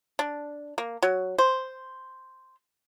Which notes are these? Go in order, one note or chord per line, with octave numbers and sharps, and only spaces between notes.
D4
A#3
F#3
C5